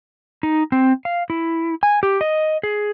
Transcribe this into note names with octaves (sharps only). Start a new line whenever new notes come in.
D#4
C4
F5
E4
G#5
G4
D#5
G#4